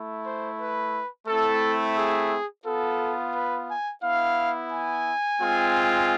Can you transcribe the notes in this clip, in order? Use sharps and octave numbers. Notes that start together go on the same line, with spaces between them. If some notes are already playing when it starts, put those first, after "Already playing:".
Already playing: A3 E4
C5
B4
A3 C4 E4 A4
G#4
B3 F4 A4
B4
G#5
B3 E4 F5
G#5
G#3 C4 F4